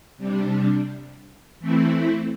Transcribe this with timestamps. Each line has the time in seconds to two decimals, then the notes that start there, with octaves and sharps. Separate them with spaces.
0.18 C3 G3 D4
1.60 E3 A3 C4 E4